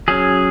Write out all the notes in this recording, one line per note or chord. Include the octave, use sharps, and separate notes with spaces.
F#3 C#4 G#4